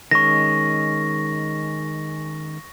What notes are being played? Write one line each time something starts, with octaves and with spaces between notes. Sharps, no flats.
D#3 G#3 C#4 C#6 A#6